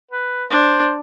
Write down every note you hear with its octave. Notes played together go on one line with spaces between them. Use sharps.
B4
D4 C5